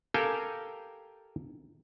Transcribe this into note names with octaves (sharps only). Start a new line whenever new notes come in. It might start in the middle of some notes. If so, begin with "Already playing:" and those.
G4 A4 A#4 F5 G5 G#5